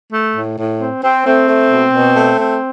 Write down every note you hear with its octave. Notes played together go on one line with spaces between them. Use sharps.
A3
A2
A2
C4
C4
A3 C4
A3
B2
B2
A3
C4